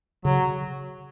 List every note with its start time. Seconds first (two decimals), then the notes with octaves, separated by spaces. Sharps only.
0.25 C#3 F#3